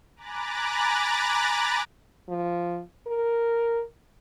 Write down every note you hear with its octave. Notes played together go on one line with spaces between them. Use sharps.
G#5 A#5 B5 D6 F#6 A6
F3
A#4